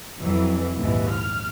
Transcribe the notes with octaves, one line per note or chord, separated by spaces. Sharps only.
F2 E3 F#3
A#1 D#2 G#2 E3
F6